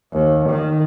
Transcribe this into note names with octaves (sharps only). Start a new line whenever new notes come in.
D#2
D#3